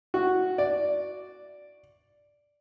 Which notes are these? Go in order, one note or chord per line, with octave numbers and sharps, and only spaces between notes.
F#4
D5